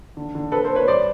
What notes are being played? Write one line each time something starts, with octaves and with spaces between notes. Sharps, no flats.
D3
D3
C4 A4 B4
A#4 C5
C4
B4 C#5
G3 C5 D5